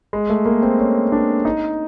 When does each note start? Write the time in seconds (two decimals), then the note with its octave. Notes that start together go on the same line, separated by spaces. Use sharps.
0.13 G#3
0.30 A3
0.46 A#3
0.62 C4
0.79 C#4
1.12 D4
1.45 D#4